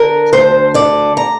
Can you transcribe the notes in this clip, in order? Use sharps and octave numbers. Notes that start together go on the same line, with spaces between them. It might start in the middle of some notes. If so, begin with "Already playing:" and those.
Already playing: D3 A#4
D2 C5
D3 D5
A#5